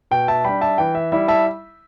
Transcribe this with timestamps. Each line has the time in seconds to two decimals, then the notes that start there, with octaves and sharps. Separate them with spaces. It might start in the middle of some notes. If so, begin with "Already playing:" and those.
0.11 B2 G5
0.28 E5 A5
0.44 G3 D4 G5 B5
0.61 E5 A5
0.78 E3 G5
0.95 E5
1.12 G3 E4 E5
1.28 E5 A5